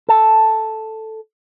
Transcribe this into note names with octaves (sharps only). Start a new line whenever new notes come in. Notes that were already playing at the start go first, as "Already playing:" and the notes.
A4